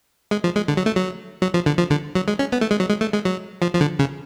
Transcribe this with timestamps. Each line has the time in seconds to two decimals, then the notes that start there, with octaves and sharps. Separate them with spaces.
0.31 G#3
0.44 F3
0.56 G#3
0.68 D3
0.77 F#3
0.86 A3
0.96 F#3
1.42 F#3
1.54 F3
1.66 D3
1.78 F3
1.90 D3
2.15 F#3
2.28 G#3
2.39 C#4
2.52 B3
2.61 A3
2.71 G#3
2.80 F#3
2.89 G#3
3.01 A3
3.13 G#3
3.25 F#3
3.62 F3
3.75 F3
3.81 D3
3.99 C#3